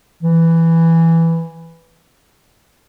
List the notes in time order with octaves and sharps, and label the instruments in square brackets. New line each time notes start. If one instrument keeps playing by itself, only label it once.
[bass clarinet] E3